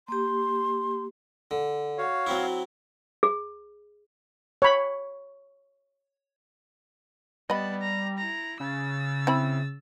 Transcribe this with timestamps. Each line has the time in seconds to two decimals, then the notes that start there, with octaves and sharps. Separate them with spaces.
0.08 A#3 G4 C6
1.51 D3
1.98 F#4 C#5 F5
2.27 F#3 C4 E4
3.23 G#4
4.62 C#5 B5
7.50 G3 B3 D#5 A5 B5
7.80 A#5
8.18 E4 A#5
8.60 C#3 E6 A6
9.27 C4 E4 B5